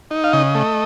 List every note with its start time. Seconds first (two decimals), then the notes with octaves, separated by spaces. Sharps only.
0.11 D#4
0.24 F5
0.33 C#3 D#5
0.55 A3